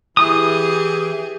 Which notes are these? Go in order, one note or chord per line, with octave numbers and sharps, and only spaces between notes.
E3 G4 G#4 D#6